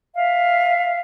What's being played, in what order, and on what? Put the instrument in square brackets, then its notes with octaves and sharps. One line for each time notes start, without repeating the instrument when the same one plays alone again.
[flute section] E5 F5